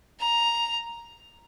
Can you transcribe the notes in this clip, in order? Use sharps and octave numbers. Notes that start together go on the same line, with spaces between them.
A#5